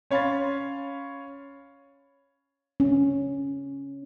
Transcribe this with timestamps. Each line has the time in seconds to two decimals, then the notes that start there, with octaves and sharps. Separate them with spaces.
0.11 C#4 C#5 F5 B5 C6 A6
2.80 C#4